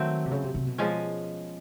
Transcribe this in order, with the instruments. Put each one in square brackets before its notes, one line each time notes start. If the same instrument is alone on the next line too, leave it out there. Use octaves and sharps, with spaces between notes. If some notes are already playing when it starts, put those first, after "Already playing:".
Already playing: [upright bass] D#3 [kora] F#3 A3 C4
[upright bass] C3
C#3
C3
C3
B2
[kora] F3 G#3 C#4